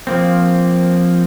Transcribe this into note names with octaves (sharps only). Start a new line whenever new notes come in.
F3 A#3 C4